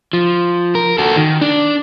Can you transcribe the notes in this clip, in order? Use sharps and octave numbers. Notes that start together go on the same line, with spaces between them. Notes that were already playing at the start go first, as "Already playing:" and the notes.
F3
A#4
F#4 A4
D#3
D4